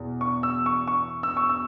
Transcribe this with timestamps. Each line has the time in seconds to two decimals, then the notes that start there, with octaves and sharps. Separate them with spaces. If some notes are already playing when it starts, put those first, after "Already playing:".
Already playing: E2 B2
0.21 C#6
0.43 E6
0.66 C#6
0.88 C#6
1.23 E6
1.37 C#6
1.49 E6